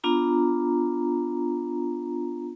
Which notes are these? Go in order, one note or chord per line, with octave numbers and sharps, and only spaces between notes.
B3 D4 F4 A#5